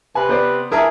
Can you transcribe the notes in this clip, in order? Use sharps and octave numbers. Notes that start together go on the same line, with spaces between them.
C3 B4 G#5
B3 C5 D5
E3 G#4 A#4 E5 A5